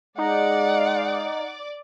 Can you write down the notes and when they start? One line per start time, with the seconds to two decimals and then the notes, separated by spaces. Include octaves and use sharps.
0.18 G#3 D#4 D5 F#5 D6